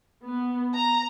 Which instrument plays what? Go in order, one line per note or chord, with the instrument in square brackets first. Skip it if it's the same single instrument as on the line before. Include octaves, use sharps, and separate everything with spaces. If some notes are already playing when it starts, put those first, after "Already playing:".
[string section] B3
A#5